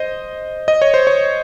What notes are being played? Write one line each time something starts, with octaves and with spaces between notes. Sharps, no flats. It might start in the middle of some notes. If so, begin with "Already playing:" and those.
Already playing: C5 D#5
D#5
C#5
C5
C#5